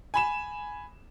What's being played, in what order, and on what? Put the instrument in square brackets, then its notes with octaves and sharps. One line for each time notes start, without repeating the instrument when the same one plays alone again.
[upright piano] G#5 B5 E7